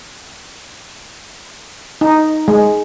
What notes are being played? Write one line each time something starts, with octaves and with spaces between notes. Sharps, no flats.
D#4
G#3